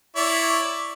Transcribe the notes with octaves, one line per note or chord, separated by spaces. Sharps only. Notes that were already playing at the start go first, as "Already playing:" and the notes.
E4 C#5 D5